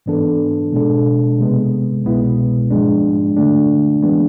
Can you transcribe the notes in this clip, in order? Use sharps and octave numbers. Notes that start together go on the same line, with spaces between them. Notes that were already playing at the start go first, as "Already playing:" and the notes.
G#2 E3 B3 D4 A4
B2 G#3 D4 A4
C3 G#3 B3
C2 B2 G#3 B3 E4
G#2 F3 G#3 D4
D3 A3 D4
E3 G#3 B3 D4